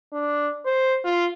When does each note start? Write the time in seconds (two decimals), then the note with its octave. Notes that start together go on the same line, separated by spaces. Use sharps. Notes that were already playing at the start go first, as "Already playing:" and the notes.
0.12 D4
0.66 C5
1.04 F4